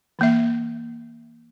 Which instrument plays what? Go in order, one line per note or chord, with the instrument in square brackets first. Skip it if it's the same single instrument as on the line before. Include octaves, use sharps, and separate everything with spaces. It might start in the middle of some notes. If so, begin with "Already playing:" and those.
[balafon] E3 A#3 E5